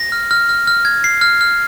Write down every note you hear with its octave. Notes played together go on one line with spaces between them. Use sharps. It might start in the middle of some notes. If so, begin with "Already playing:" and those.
Already playing: A#6
F6
F6
F6
F6
G#6
C7
F6
F6